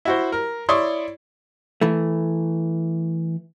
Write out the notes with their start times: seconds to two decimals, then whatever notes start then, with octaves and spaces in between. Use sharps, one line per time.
0.05 E4 F#4 C5
0.32 A#4
0.69 E4 C#5 D5 C6 C#6 D#6
1.81 E3 A3